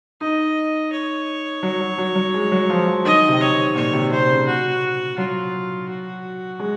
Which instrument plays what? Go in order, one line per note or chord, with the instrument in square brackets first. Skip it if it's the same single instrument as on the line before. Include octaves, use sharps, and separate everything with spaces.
[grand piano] D#4 [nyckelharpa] D#5
[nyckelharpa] C#5
[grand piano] F#3
F#3
F#3
F#3
G#3
F#3
F3
F3
[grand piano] D#3 [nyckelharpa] D#5
[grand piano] C3
[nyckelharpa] C#5
[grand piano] C3
[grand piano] A#2 [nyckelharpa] C#5
[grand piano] C3
[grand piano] C3 [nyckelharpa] C5
[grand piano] C#3
[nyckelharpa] F#4
[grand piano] F#3 [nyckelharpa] F4
[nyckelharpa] F#4
[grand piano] G#3